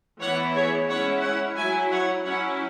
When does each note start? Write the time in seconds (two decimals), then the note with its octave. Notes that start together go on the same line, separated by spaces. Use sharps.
0.20 E3 B3 E4 C#5 F#5
0.55 G#4 C#5
0.89 G#3 C#4 E4 C#5 F#5
1.22 C#5 F#5
1.56 F#3 E4 E5 G#5
1.90 C#5 F#5
2.24 F#3 C#4 E4 C#5 F#5